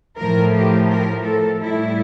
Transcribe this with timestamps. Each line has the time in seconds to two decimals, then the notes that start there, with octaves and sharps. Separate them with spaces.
0.17 A2 F3 A#4
0.54 G4
0.89 A#4
1.24 A4
1.60 A2 G3 E4